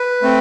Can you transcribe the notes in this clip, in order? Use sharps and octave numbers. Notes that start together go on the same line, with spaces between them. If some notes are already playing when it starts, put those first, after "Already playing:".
Already playing: B4
A3 C4